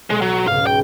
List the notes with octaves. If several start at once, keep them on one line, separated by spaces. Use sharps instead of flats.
B1 G#3
F#3
C#2 G#2 F5
G5